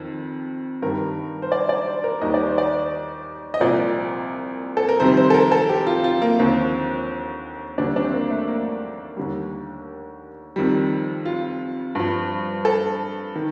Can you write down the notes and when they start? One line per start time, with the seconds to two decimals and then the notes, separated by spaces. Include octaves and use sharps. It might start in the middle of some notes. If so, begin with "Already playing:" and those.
Already playing: F2 D#3
0.82 G2 D#3 G3 A#4
1.42 C5
1.52 D5
1.69 D5
1.87 C5
2.04 A#4
2.21 D#2 D#3 G3 D#5
2.34 D5
2.46 C5
2.58 D5
3.54 D#5
3.61 C2 A#2 F3 D5
4.77 A4
4.89 A#4
5.00 F2 C3 D#3 G3 C5
5.17 C5
5.30 A4
5.34 A#4
5.52 A4
5.69 G4
5.87 F4
6.04 F4
6.22 A#3
6.39 D#2 D3 F3 C4
7.78 D#2 D3 G3 D4
7.96 D4
8.04 C4
8.13 A#3
8.30 A3
8.48 A#3
9.17 D#2 D3 G3
10.56 F2 D#3 G3
11.25 F4
11.95 G2 F3
12.65 A4
13.35 D#3